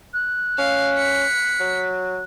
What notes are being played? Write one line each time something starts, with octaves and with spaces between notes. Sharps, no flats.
F#6
C#4 F5
B6 C#7
F#3